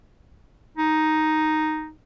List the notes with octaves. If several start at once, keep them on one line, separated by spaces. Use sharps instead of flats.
D#4